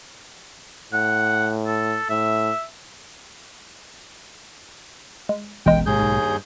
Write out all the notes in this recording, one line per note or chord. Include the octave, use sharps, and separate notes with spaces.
A2 F#5
A4
A2 E5
G#3
E1 A1 G#3 B3 G5
D#2 G#2 C3 G#4 G6
B1 G#2
G2